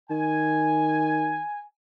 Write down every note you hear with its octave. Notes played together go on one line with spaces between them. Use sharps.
D#3 G#5